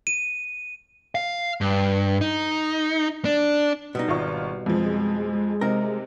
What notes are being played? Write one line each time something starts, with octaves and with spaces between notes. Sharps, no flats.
D#7
F5
G2
D#4
D4
B2 G3 D#4
G#1 F4 C#6
F2 F3 G#3
C3 C4 D#4 A#4